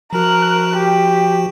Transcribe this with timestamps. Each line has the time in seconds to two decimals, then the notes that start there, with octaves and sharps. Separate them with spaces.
0.13 F3 F#4 A#4 F#6
0.76 G4